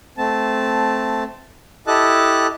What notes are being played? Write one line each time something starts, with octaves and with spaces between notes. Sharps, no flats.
A3 C4 A5
E4 G4 A4 D#5 A5 F#6